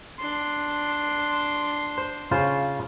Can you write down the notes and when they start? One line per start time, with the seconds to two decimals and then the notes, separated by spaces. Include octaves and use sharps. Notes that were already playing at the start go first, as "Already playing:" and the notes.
0.19 D4 C6
1.98 C5
2.31 C#3 F4 C5